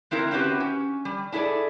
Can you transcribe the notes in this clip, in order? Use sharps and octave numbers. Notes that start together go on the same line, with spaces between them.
G#3 C4 E4 A#4
C4 C#4 E4 F#4 G4 B4
C#4
G3
D4 E4 G#4 A4 D5